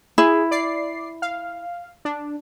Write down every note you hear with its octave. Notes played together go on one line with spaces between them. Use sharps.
E4 G#4
D5 C7
F5
D4